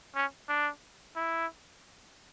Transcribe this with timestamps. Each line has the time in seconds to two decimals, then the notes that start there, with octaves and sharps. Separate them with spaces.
0.15 C#4
0.49 D4
1.16 E4